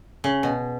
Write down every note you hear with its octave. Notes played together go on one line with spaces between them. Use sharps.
C#3
B2